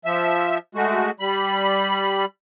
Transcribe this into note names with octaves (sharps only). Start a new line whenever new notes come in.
F3 E5
G#3 A3 F#4
G3 B5